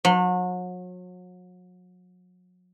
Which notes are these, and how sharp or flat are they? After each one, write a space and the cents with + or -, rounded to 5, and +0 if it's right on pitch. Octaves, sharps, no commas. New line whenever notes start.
F#3 -35